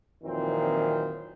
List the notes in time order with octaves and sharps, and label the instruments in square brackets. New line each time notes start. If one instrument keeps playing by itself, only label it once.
[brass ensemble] F2 A#2 D#3 E3 F#3 C4